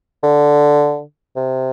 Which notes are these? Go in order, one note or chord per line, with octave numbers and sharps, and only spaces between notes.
D3
C3